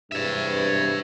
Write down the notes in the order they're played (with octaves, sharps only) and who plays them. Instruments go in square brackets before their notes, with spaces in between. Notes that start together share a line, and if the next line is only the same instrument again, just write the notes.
[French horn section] E2 G2 C3 [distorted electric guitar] C#5 E5